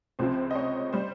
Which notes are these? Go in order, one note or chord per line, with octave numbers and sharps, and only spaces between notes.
C#2 C3 F3 C4 C5
D#5
C#5
G3 C5